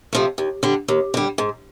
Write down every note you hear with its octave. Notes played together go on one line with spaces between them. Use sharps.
C3 F3 A3
D#2
D3 G3
D#2
D3 G3
G#2